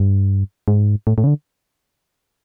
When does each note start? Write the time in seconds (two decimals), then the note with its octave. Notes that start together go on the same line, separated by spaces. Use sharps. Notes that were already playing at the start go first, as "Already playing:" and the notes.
Already playing: G2
0.68 G#2
1.07 A2
1.18 A2
1.24 C#3
1.27 D3